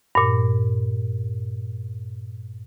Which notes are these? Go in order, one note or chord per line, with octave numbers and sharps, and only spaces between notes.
G2 A#2